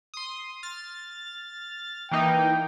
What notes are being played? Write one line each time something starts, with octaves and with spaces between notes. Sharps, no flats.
C6 D#6
F6 A6
E3 A#3 D#4 G5